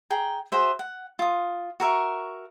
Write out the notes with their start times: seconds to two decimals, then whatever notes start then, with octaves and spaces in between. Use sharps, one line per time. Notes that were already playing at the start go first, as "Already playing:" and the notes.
0.10 G#4 G5 A#5
0.52 F#4 G#4 C5 E5
0.79 F#5
1.19 F4 D#6
1.80 F#4 A#4 E5 C#6